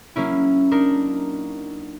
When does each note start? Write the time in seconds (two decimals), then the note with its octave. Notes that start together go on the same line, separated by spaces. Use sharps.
0.16 F#3 A#3 C#4 E4
0.71 D4 D#4 A#4